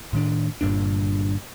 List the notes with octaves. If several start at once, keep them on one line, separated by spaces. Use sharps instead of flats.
A2 D#3 D4
G1 G2 A#2 D4